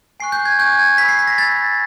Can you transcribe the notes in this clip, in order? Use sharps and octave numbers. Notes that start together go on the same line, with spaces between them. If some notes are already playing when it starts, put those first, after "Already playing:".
G#5 C#6 F#6 C7
G6
G#6
G#5 C#6 F#6 G6
G#6
B5 E6 G6 B6
C7
B6
A#6
B5 E6 G6 A6